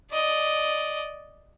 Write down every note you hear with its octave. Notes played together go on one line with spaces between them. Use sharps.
D5 D#5